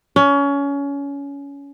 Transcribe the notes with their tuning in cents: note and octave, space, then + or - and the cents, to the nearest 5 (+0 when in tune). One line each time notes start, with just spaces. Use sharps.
C#4 +25